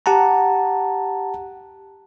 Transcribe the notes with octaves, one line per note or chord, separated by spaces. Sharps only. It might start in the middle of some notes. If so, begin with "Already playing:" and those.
G4 F#5 A5 A#5